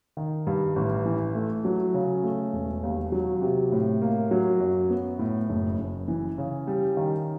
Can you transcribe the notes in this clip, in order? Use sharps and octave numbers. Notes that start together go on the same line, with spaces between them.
D#3
G2
A1
E3
A3
F#3
C#3
A3
E1
D#2
F#3
C3
A2
A#3
F#3
F#2
B3
A2
F#1
F#1
E3
C#3
G3
D#3